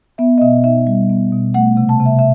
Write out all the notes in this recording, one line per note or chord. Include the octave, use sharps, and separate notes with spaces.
B3 E5
D#5
B2 E5
D#4 E5
G3
B3
B2
A3 F#5
C3
A5
C3
E5
E5